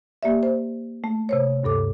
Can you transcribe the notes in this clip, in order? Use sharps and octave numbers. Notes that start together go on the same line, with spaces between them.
A#3 G4 D5 E5
C5
A3
C3 C5 C#5
D2 G2 A4 D6